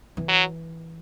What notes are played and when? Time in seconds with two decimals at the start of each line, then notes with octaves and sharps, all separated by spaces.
0.17 E3
0.29 F#3